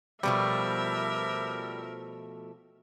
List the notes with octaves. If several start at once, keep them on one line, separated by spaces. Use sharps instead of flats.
B2 F3 G3 A3 A#4 E5